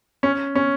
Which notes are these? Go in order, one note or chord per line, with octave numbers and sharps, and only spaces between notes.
C#4
C#4